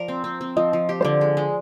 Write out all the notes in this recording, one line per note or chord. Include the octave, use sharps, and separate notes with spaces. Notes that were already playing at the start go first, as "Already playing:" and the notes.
Already playing: F3 A#4 D5
C4
C4
C4
F3 D#5
F3
G4
C5
D3 D5
G#3
G#3